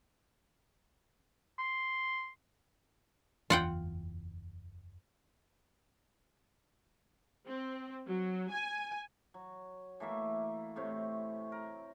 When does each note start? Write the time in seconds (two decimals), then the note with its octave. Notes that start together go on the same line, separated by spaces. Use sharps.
1.59 C6
3.50 F#1 E2 E3 F4 F#5 G5
7.47 C4
8.08 F#3
8.51 G#5
9.34 F#3
10.00 E3 A3 A#3 E5
10.76 A2 C3 C4 C#5
11.52 A#4